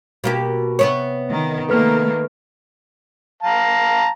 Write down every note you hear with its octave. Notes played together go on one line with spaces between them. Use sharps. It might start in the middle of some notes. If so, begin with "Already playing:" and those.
B2 A#3 G4
C3 B3 C#5
D#3
D#3 A3 A#3 A4 B4 F6
F5 A5 A#5